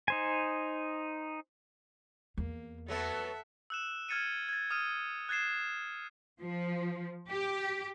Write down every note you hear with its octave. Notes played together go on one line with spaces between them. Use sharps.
D#4 C5 G#5
E2 A#3
F#3 A3 B3 A4 E5 F#5
E6 F#6 E7
F6 G#6 A6 C#7 D#7
G#6 A6
D#6 F6 D#7
F#6 G#6 A6 C7 E7
F3
G4